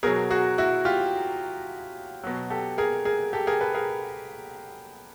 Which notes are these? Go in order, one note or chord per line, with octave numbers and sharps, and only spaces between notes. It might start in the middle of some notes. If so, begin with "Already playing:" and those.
B2 F#3 G#4 A#4
F#4 G#4
E4 F#4
F4 G4
B2 F#3
G4 A4
G#4 A#4
G#4 A#4
G4 A4
G#4 A#4
A4 B4
G#4 A#4